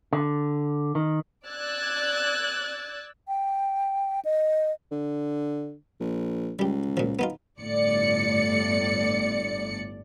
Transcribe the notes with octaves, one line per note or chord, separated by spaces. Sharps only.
D3
D#3
D5 E6 F#6 G#6 A6
G5
D#5
D3
A#1
C#2 G3 G4
A#2 F3
B3 D#4 F4
G1 A2 D5 C#7